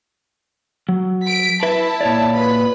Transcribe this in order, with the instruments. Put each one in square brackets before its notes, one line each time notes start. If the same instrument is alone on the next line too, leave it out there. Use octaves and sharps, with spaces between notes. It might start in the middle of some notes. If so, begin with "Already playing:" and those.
[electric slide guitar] F#3
[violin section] B6 D7
[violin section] E4 A5 [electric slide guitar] B4 E5
[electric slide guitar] A#2 C#5 D5
[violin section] B4 B5